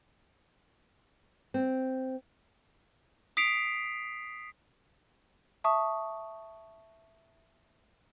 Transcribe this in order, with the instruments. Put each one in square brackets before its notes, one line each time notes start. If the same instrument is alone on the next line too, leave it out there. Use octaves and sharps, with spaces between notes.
[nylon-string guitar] C4
[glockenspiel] D#6 B6 C7 D7 F7
[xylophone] E5 A5 C#6 D#6